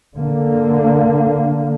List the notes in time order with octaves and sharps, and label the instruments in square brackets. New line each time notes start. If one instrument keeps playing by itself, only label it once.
[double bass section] D3 A#3